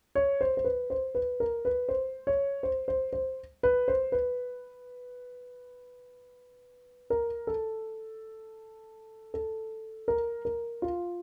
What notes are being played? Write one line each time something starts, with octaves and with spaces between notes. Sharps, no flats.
C#5
C5
C5
B4
C5
B4
A#4
B4
C5
C#5
C5
C5
C5
B4
C5
B4
A#4
A4
A4
A#4
A#4
F4